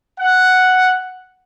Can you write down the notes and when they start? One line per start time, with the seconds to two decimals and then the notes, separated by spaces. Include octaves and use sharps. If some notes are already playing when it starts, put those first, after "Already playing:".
0.19 F#5